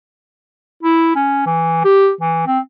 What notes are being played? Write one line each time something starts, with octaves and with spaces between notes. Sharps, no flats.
E4
C#4
E3
G4
E3
C4